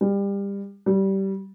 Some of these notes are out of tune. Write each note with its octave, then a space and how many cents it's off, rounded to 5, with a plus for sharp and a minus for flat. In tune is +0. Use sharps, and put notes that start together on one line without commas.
G3 +25
G3 -20